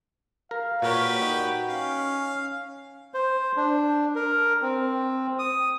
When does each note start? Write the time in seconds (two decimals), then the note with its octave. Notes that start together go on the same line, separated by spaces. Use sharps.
0.51 A#4 F5
0.82 A#2 F#4 G4 A#4 B4 C#5
1.22 D#4
1.69 C#4 F5
3.14 C5
3.57 D4
4.15 A#4
4.62 C4
5.39 D#6